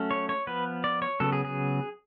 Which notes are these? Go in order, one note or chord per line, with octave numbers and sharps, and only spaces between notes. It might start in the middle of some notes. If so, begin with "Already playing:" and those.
Already playing: F#3 A3 C#4
C#5
C#5
F3 B3 B4
D5
C#5
C#3 F#3 B3 A4
G#4
G#4